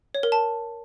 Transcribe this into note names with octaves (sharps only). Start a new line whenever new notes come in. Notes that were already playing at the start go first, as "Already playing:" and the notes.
C#5
A#4
A5